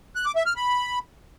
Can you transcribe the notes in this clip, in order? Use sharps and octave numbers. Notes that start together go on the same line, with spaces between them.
F#6
D6
E5
F6
B5